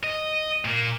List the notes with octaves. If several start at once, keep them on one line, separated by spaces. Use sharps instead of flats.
D#5
A#2 A#3